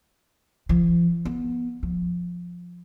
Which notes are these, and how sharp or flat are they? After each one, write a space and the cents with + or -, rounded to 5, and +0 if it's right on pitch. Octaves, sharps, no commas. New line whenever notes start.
F3 -35
B3 -20
F3 +10